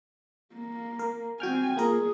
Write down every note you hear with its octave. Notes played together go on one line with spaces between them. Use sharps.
A#3
A#4
C4 F#4 G5 G#5 F6
A#3 F4 G#4 A#4